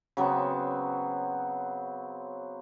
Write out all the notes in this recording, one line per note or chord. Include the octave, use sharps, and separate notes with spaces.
C#3 F#3 B3 C4